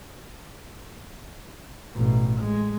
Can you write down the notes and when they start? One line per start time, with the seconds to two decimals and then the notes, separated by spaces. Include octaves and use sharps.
1.95 A1 B2
2.40 G#3